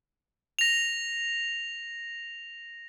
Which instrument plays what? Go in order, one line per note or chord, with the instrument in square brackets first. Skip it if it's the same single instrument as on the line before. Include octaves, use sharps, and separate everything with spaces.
[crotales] A#6 F7